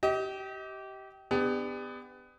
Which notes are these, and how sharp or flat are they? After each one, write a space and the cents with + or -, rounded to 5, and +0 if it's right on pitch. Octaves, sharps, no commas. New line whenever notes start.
G4 -20 D#5 +35
B3 +25 D4 +20 G4 +40